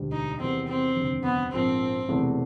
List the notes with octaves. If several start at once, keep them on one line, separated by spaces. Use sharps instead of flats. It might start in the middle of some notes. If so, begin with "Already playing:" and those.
Already playing: E1 D2 D3 G3
D#4
E2 C3 D#3 G3 B3 C4
C4
F1 D#2 D3
B3
A#1 G#2 F3 A#3 C4
E1 E2 C3 E3 A3